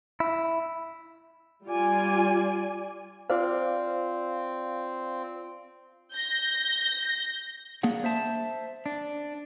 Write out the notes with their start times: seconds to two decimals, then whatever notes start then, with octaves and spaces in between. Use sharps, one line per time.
0.20 E4
1.65 G3 F4 D5 G#5
3.30 C4 F4 C5 D5 F5
6.12 G6 A#6
7.83 A#3 D4 G#4 F#5
8.04 C5 E5 A5
8.86 D4